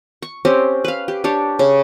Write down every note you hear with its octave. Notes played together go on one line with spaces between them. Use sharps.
C#6
C4 C#4 G4
B4 F5
G4
D4 G4 C#5
C#3